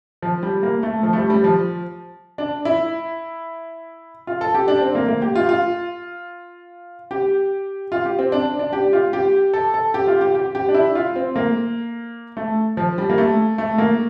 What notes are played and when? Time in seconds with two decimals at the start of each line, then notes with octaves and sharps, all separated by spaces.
0.22 F3
0.43 G3
0.63 A#3
0.83 A3
1.03 F3
1.13 A3
1.17 G3
1.30 G3
1.44 F3
2.38 D4
2.65 E4
4.27 F4
4.41 A4
4.54 G4
4.68 D4
4.81 C4
4.95 A#3
5.08 A#3
5.22 G4
5.36 F4
5.49 F4
7.11 G4
7.92 F4
8.05 G4
8.19 C4
8.32 D4
8.59 D4
8.73 G4
8.93 F4
9.13 G4
9.53 A4
9.74 A4
9.94 G4
10.08 F4
10.21 G4
10.35 G4
10.55 G4
10.69 D4
10.74 E4
10.95 F4
11.16 C4
11.36 A#3
12.37 A3
12.77 F3
12.98 G3
13.10 A#3
13.18 A3
13.58 A3
13.78 A#3